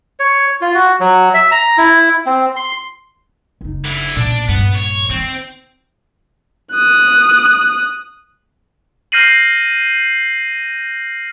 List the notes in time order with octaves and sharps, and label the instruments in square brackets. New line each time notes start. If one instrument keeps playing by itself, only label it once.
[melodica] C#5
F4
F#4
F#3
E5
A#5
E4
C4
C6
[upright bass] F#1 D#4
[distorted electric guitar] D3 E4
[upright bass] B1 A#2 [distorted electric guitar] D4
[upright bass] A#1 G2 [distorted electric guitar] B3
[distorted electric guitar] C#5
[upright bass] D#3 [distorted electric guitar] C4
[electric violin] D#6 F#6
[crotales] F6 G6 A#6 C7 D#7 F#7